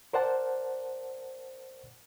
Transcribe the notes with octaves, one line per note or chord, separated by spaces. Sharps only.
A#4 C5 D5 F#5 A5